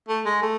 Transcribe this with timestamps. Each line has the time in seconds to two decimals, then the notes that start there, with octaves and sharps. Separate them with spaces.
0.08 A3
0.25 G#3
0.42 A3